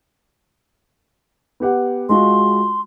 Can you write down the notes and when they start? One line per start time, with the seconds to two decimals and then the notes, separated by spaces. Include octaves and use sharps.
1.60 B3 G4 F#5
2.09 G#3 F4 F#4 C6